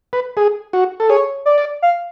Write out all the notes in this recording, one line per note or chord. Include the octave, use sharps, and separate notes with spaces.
B4
G#4
F#4
A4
G#4 C#5
D5
D5
F5